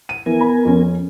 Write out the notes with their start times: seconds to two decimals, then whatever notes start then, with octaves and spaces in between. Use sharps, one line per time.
0.09 D#7
0.26 E3 B3 A#4 G#5
0.41 B5
0.65 F2 C#4